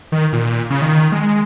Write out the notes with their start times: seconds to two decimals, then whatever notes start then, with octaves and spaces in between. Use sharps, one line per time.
0.12 D#3
0.33 A#2
0.70 C#3
0.82 D#3
1.12 G#3